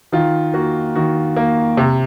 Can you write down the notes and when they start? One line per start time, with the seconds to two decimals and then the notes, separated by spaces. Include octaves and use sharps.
0.12 D#3 F4
0.54 A#3 F#4
0.95 D#3 F#4
1.36 A#3
1.77 C3